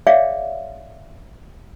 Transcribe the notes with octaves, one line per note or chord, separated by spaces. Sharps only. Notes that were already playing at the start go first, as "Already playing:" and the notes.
G#4 C#5 D5 E5 F5 G5